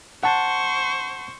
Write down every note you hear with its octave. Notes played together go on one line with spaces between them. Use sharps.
C5 F#5 A5 C#6